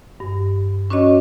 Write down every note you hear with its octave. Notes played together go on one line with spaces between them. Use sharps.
G2
C#4 D4 F#4 C#5 D#5